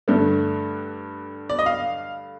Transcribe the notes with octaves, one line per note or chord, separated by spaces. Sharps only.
G2 D3 A3
D5
D#5
F5